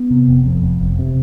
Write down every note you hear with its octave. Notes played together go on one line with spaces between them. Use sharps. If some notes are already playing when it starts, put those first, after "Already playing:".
Already playing: B3
C3
F1
F2
F1
F1
C3